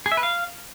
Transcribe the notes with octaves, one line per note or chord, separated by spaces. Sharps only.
G#4
E5
B4
F5